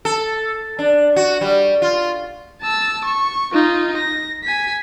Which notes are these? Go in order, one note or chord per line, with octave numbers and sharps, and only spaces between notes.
A4
D4
F#4
G3
F4
A5 E6
C#6
D#4 F4
A#6
G#5 B6